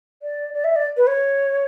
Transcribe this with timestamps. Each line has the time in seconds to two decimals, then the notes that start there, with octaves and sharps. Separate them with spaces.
0.22 D5
0.53 D5
0.64 E5
0.75 D5
0.97 B4
1.07 C#5